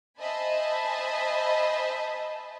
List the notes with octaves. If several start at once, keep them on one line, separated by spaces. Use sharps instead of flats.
C5 D#5 E5 G#5 A5 B5